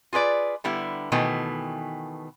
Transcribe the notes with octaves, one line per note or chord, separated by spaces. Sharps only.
F4 G#4 B4 D5
D3 G3 B3 E4
B2 D#3 E3 A3 B3